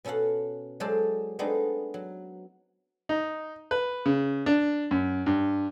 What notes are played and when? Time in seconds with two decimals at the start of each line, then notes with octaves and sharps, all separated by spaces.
0.05 B2 C#4 A4 F5 F#5
0.80 F#3 G#3 A4 C5 D5 A5
1.39 G#3 A3 B3 C4 D4 D#4
1.94 F#3
3.09 D#4
3.71 B4
4.06 C#3
4.46 D4
4.91 F#2
5.26 G2